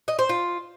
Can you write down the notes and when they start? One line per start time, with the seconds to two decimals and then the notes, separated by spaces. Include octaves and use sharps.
0.08 D#5
0.19 C5
0.29 F4